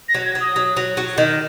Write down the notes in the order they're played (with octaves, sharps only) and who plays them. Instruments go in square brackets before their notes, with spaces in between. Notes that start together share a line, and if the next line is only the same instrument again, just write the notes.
[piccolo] A#6
[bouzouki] F#3
[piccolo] G#6
[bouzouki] F#3
[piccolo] D#6
[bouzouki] F#3
F#3
F#3
D#3